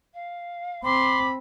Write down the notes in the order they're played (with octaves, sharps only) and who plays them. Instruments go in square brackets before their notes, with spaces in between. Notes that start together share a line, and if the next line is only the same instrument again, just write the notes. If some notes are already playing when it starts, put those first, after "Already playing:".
[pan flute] F5
[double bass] C4 [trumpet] B5 [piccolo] C6 [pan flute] D6